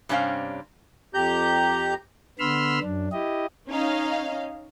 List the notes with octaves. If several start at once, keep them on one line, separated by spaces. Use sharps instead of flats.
G2 C3 C#4 D4 C5 F5
F2 G4 A#5 G6
D3 B3 B5 C6 E6 F6
F#2 D4
E4 G4 D#5
C#4 D#4 F5